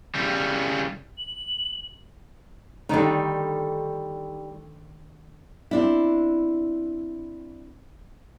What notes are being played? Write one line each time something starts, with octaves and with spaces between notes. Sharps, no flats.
C#3 G3
F#7
D3 D#3 G3 A3 D#4
C4 D4 E4